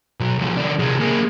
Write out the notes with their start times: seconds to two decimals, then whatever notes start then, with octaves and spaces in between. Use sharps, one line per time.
0.20 B2 F#3
0.38 C2 F3
0.57 D#3 D4
0.79 C3 G#3
1.00 A#3 G#4